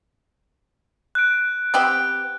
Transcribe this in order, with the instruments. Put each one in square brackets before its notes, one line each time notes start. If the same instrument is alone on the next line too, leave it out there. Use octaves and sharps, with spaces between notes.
[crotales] F#6 D7
[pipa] B3 C4 G4